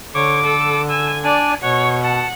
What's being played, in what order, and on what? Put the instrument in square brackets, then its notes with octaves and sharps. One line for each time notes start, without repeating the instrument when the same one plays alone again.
[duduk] D3 [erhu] C#5 [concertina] D6
[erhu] A4
[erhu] G#5 [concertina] E6
[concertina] D4 G#5 [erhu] D5
[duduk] B2 [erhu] C#5 [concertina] F#5
[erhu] F#5 [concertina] A5